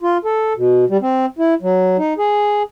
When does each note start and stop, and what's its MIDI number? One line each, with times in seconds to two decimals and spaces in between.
0.01 0.17 65
0.25 0.53 69
0.57 0.85 47
0.90 0.97 55
1.02 1.26 60
1.39 1.54 64
1.62 1.97 54
1.98 2.14 63
2.18 2.63 68